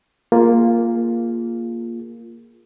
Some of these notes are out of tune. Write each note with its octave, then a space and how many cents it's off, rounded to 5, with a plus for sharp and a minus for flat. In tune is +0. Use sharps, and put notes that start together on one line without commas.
A#3 +0 F4 +0 G#4 +0